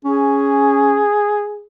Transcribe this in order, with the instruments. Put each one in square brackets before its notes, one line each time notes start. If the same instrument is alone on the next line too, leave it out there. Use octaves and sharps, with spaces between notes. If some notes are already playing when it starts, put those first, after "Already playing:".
[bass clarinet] C#4 [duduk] G#4